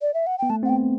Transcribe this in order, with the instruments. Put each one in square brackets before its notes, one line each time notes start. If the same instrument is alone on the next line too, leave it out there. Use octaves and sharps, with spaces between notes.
[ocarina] D5
E5
F#5
[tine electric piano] B3 [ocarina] G5
[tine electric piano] A3 [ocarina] A5
[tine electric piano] C4 [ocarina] F#5
[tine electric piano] B3 [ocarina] G5